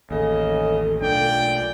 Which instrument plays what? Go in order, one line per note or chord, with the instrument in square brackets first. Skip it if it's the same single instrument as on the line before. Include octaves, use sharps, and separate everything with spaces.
[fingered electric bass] A1 D#2 [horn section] C#3 D#5 [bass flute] A4
[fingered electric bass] B1 A3 D4 [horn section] A#2 F4 D5 [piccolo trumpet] G5